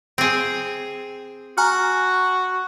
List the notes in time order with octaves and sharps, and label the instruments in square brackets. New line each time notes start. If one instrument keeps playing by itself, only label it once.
[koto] C4 G#4
[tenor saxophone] F#4 [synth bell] G#5 A#5 F6